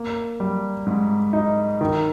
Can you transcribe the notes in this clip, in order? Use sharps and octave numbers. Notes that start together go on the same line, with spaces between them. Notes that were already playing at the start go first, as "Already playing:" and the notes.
Already playing: A#3
G3
G#2
D#4
D#3